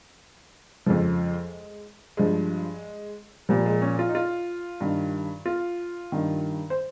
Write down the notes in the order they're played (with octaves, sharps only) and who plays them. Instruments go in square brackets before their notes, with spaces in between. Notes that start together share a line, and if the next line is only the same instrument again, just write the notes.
[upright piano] F2 C#3 F3 G#3
G2 F3 G#3
A#2 F3 G3
G#3
C#4
F4
D#4
F4
G2 D#3
F4
G2 D#3
C5